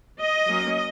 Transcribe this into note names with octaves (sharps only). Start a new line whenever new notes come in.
D#5
F#3 A#3 C#4